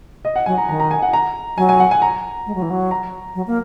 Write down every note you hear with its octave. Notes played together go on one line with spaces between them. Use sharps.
D#5
F#5
F#3 G#5
A#5
D#3 A#5
A#5
G#5
F#5
A#5
F#3 G#5
G#5
F#5
G#5
A#5
G#3
F#3
E3
F#3
A#5
F#3
A#3